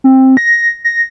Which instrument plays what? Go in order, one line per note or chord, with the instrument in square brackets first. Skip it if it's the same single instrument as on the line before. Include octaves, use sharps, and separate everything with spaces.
[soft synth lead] C4
A#6
A#6